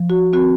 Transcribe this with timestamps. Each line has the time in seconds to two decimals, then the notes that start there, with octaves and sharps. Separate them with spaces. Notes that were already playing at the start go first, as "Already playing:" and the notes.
Already playing: F3
0.10 F#4
0.33 C4 F#4